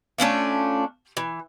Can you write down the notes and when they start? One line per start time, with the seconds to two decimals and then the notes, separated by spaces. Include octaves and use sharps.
0.18 A3 C#4 D4 F4
1.17 E3